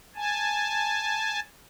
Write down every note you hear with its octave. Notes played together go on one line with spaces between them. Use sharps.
G#5 A5